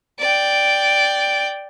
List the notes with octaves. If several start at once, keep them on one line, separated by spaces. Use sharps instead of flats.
D5 G5